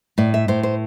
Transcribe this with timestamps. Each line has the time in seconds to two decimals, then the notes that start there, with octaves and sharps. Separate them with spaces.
0.18 A2 D5
0.34 E5
0.48 A2 C5
0.63 C5